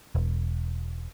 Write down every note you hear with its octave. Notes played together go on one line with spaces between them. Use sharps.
E1